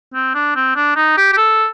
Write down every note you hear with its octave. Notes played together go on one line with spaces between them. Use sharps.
C4
D4
C4
D4
D#4
G4
G4
A4